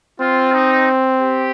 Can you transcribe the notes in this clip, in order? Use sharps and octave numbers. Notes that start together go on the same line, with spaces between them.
C4 F4
D#4
G4